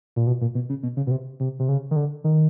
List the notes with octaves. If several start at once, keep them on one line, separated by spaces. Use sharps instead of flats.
A#2
B2
A#2
B2
C#3
B2
C#3
B2
C3
C3
C3
C#3
D#3
D3
D#3